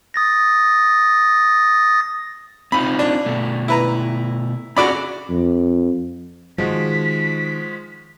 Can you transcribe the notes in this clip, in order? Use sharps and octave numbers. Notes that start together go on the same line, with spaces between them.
D#6 A6 A#6
C4 D#4 F4 B5
D4
B2 A3
E4 B4 A#5
C#4 F#4 G#4 A4 D5 B5
F2
D#3 F3 G#3 F#4 B6